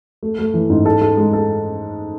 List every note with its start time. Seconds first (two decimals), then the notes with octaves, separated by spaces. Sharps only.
0.23 A3
0.39 A3
0.54 E3
0.70 G#2
0.86 A4
1.01 A4
1.17 G#3
1.33 A4